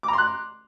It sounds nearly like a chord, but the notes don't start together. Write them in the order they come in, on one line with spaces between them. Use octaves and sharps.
D6 A#5 C6 F#6